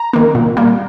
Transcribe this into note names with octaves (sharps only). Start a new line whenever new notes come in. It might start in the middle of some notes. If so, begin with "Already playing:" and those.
Already playing: A#5
D#3 A#3
A#2
G3 A#3